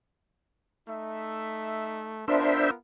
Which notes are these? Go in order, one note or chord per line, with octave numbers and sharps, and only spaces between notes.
A3 D#4 E5
B3 D4 F4 A#4 C5 E5